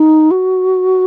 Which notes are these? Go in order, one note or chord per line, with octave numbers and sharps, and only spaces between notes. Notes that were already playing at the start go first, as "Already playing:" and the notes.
Already playing: D#4
F#4